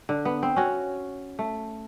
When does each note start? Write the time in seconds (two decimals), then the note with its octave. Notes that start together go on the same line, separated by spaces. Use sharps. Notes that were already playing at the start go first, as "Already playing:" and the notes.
0.09 D3
0.25 B3
0.43 C4
0.56 C#4 F#4
1.39 A3